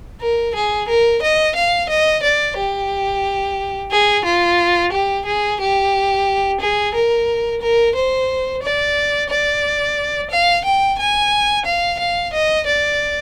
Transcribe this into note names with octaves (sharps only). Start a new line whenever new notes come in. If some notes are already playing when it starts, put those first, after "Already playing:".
A#4
G#4
A#4
D#5
F5
D#5
D5
G4
G#4
F4
G4
G#4
G4
G#4
A#4
A#4
C5
D5
D5
F5
G5
G#5
F5
F5
D#5
D5